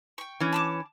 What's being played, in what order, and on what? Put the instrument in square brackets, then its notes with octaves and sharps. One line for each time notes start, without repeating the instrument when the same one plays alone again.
[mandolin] G5 C#6
[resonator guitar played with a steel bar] E3 C#4
[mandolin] A5 B5 D6